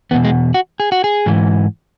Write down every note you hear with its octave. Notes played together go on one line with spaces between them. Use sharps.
E2 B2 B3
G#3
F#4
G#4
F#4
G#4
G#2 E3